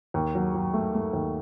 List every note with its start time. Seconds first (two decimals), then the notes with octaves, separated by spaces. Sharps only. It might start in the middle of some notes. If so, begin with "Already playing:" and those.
0.14 D#2
0.35 F#3
0.54 F#3
0.74 A3
0.94 A3
1.13 D#2